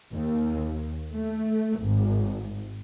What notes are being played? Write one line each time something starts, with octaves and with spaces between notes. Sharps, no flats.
D#2
A3
G#1